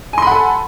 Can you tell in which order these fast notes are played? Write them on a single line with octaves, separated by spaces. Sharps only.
G#5 C6 B5 F#5 A4